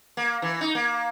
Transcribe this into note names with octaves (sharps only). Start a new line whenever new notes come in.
A#3
E3
D#4
A#3